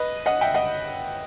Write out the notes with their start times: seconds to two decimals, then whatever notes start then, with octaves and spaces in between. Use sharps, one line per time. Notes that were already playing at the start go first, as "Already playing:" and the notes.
Already playing: B4 D#5
0.26 D#5 F#5
0.41 E5 G5
0.54 D#5 F#5